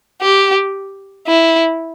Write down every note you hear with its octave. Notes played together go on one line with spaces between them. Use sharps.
G4
E4